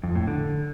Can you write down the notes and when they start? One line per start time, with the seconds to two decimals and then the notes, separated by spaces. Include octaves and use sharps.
0.03 F2
0.15 A2
0.27 D3